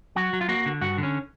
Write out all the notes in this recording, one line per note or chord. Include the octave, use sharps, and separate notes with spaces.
F#3 F#4
F#3
F4
A#3 F#4
D3
G2 F#4
D3
C#4